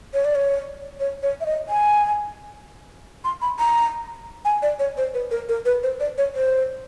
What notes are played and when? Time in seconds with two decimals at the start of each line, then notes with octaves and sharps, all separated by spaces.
0.14 C#5
0.25 D5
0.35 C#5
1.00 C#5
1.23 C#5
1.41 E5
1.46 D#5
1.69 G#5
3.24 C6
3.42 B5
3.59 A#5
4.45 G#5
4.62 D5
4.79 C#5
4.97 C5
5.14 B4
5.31 A#4
5.49 A#4
5.65 B4
5.83 C5
6.00 D5
6.18 C#5
6.35 C5